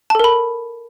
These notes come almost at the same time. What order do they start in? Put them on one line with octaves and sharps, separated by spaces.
A5 A4 A#4 B5